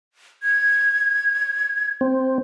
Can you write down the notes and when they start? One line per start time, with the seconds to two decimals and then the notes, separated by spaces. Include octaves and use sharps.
0.43 G#6
2.01 C4